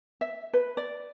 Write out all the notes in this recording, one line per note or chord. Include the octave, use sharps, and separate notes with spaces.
E5
B4
D5